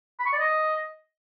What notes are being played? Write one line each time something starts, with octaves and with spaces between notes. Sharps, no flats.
B5
C#6
D5
D#5